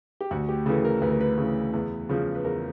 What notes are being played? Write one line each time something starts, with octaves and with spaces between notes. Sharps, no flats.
G4
D2 F#4
G4
C#3 E3 A4
A#4
D2 B4
A#4
B4
C#3 E3
E2
C#3 F3
B4
E2 A#4